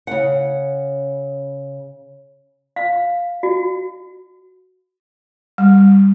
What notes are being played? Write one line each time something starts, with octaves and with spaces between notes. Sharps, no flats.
C#3 F#5
F5
F#4
G3